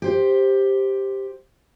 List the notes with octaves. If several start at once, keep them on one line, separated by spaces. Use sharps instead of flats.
G4 C5